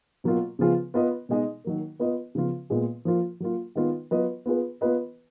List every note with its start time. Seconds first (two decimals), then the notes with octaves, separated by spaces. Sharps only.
0.24 B2 F#3 A#3 F4
0.59 C#3 F3 B3 F4 G#4
0.94 B3 F4 B4 D#5
1.29 B2 G#3 D#4 G#4 D#5
1.64 D#3 F#3 A#3
2.00 B3 F4 B4 D#5
2.35 C#3 F3 B3 F4
2.70 A#2 G#3 B3 F4 G#4
3.05 F3 A#3 F4
3.40 F#3 A#3 F4
3.75 D#3 G#3 B3 F4
4.11 F#3 B3 F4 B4 D#5
4.46 B3 F4 G#4 B4
4.81 B3 F4 B4 D#5